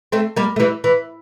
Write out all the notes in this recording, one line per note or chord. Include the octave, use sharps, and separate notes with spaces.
A3 C4
G3 A#3
A3
E3 G3
E3